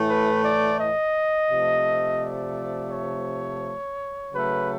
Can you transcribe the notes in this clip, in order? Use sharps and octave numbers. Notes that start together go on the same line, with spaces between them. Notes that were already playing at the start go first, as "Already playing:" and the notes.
Already playing: A2 E3 A3
B4
D5
D#5
C3 F3 A3
D5
C#5
C#3 F#3 A3 B4